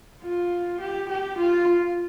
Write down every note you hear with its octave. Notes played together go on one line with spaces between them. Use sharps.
F4
G4
G4
F4